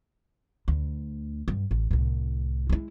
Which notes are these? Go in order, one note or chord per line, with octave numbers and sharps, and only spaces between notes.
D2
G2
A1
C2 A2
G#3 E4